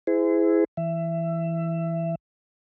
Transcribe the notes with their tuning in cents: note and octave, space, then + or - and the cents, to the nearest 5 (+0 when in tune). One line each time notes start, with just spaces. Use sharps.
E4 +0 G#4 +0 C5 -35
E3 +0 E5 +20